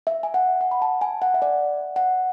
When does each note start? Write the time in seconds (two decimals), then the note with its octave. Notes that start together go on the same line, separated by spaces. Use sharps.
0.07 E5
0.23 G#5
0.34 F#5
0.61 F#5
0.71 B5
0.82 A5
1.01 G#5
1.22 F#5
1.34 E5
1.42 D5
1.96 F#5